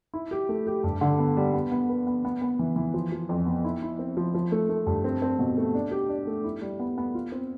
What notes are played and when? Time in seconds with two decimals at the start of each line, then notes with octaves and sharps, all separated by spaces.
0.14 E4
0.31 G4
0.49 A3
0.67 G4
0.84 G2
1.01 D3
1.19 B3
1.37 G3
1.54 B3
1.72 B3
1.89 B4
2.07 B3
2.25 B3
2.42 B3
2.59 E3
2.76 E3
2.94 F3
3.12 F3
3.29 F2
3.46 B3
3.64 E4
3.82 E4
3.99 C4
4.17 F3
4.35 F3
4.52 A3
4.69 A3
4.87 G2
5.04 C4
5.22 C4
5.39 B2
5.57 A3
5.75 D4
5.91 G4
6.09 D4
6.27 A3
6.44 E4
6.61 G3
6.80 B3
6.98 B3
7.15 F4
7.32 C4